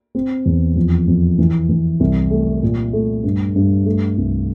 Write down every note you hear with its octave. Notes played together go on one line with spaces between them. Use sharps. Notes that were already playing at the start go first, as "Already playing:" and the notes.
C4
E2
F2
F2
E3
E3
C2
A3
A#2
A3
G2
G2
A3
C2